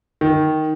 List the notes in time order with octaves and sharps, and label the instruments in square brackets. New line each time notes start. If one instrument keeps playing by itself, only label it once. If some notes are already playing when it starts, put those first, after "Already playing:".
[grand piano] D#3